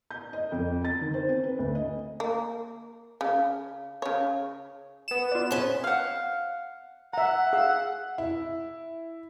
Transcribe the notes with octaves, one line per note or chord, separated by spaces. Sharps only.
G6
D#5
F2
A6
D#3
C5
C4
B4
D2
D#5
A#3
C#3
C#3 C#5
B3 E7
F4 D5
C#4 G#4 B4 C5 A5
F5 F#5
E5 F#5 A#5
G#4 F5 E6
E4